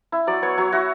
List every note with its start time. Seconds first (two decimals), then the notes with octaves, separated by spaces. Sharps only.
0.12 E4
0.27 F#3 D5
0.42 B3 C#5
0.57 F#3 C#5
0.72 E4 F#4